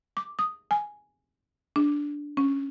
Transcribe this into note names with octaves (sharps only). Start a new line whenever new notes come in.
D6
D#6
G#5
D4
C#4